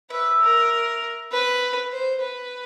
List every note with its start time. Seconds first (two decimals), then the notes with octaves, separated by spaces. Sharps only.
0.10 B4 E5
0.40 A#4
1.32 B4
1.92 C5
2.21 B4